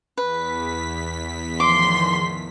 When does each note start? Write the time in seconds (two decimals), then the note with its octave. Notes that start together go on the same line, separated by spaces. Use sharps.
0.17 E2 B4 B6
1.60 A2 D#3 F3 C6 D6